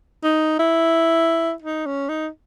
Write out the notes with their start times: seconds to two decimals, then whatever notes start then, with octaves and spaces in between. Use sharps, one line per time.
0.24 D#4
0.59 E4
1.62 D#4
1.86 C#4
2.09 D#4